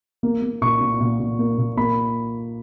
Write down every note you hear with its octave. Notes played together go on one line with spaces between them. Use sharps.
A#3
A#3
A#2 C#6
A#2
A#2
A#2
A#3
A#2
A#3 B5